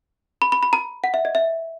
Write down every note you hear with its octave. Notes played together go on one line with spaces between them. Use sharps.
B5
B5
B5
A#5
F#5
E5
D#5
E5